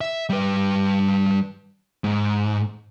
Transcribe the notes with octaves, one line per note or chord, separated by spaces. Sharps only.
E5
G3 B4
G#2